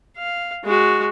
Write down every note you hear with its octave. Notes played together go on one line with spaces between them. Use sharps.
F5
G#3 F#4